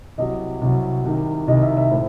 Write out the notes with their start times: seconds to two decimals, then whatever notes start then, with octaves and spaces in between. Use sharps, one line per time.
0.18 C2 C3 F#3 D#5
0.61 C2 C3 F#3
1.05 C2 C3 D#3
1.48 C2 C3 D#3 D#5
1.62 E5
1.77 E5
1.91 A2 C5